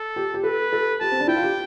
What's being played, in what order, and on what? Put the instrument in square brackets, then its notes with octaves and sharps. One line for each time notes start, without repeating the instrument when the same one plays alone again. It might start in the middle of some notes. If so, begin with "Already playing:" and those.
Already playing: [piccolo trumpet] A4
[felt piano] G4
G4
[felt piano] A4 [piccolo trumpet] B4
[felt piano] A4
[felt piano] G4 [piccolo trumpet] A5
[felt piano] C4
D4
[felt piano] E4 [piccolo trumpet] G5
[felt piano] F4
G4